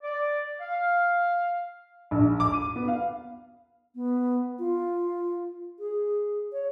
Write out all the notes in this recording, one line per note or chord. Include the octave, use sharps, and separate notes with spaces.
D5
F5
A#1
D6
D#7
B3
F5
B3
F4
G#4
C#5